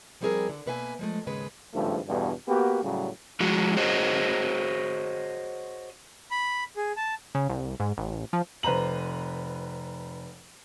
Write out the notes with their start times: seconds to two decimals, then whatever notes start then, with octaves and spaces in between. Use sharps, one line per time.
0.21 F3 G3 C4 E4 G#4 A#4
0.49 D3
0.66 B2 A#3 B4 E5 F5 G#5
0.99 F3 G#3 A3
1.27 D#2 G#2 C#3 G#3 B4
1.74 G#1 G2 C#3 F3 A3
2.07 E2 G2 B2 D3
2.48 A#3 B3 F#4 G4
2.83 A2 C#3 F#3 G3
3.40 F3 G#3 F#4
3.77 F#4 G#4 C5 C#5 D#5
6.31 B5
6.77 G#4
6.96 A5
7.35 C#3
7.49 C2
7.80 G#2
7.98 A1
8.33 F3
8.63 F1 B4 C5 A#5 F#7